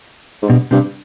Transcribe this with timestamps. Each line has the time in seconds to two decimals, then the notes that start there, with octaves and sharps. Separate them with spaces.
0.42 G#2
0.49 G2 B2
0.71 G2 C3